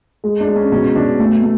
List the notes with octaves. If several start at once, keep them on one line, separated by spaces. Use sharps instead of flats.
G#3
D4
G#3
C#4
B2 C#4
B2 D4
A3
A3